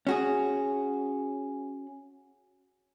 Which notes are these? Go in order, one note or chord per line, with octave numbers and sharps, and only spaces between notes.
C#4 F#4 G#4